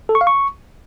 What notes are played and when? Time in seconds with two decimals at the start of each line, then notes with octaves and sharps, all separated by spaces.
0.09 A4
0.15 C#6
0.21 F5
0.27 C#6